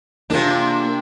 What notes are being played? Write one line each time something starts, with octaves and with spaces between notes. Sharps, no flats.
C3 A#3 D4 F4 G#4